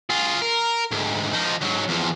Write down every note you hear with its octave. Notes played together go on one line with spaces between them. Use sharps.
F4 G#4
A#4
D2 G#2
F3 D#4
G#2 F#3
E2 F3